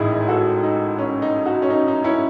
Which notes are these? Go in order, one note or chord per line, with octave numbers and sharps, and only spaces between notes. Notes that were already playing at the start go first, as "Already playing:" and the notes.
Already playing: A1 G#2 D#3 D#4 E4 G#4
F#4 A4
D#4
C#4
D#4
D#4 F#4
C#4
D#4
D#4
C#4 E4